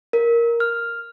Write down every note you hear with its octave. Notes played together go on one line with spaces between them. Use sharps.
A#4
F6